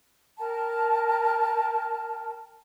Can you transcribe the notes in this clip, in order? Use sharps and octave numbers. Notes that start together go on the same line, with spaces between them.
A#4 G5 A5 A#5